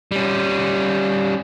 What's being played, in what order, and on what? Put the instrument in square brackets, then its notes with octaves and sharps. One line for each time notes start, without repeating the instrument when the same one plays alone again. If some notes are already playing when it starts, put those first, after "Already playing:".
[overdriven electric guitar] G3 C#4